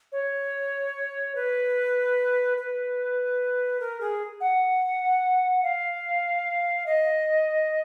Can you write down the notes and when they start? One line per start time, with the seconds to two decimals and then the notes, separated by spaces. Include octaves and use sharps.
0.12 C#5
1.35 B4
2.57 B4
3.80 A#4
4.01 G#4
4.41 F#5
5.63 F5
6.86 D#5